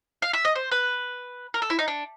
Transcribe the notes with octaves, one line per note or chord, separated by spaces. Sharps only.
F5
E5
D#5
C5
B4
A#4
A4
E4
D#4
D4